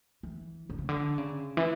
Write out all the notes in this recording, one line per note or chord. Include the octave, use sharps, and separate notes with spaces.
E3
D3
C#3
D3
C#3
E3